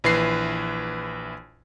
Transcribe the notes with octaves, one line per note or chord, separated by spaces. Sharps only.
A#1 E3 B4 C7